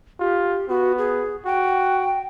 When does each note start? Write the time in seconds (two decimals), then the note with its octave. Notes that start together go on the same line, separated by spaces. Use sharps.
0.20 F4 G4
0.69 B3 F#4
0.98 G#4
1.45 F#4 G5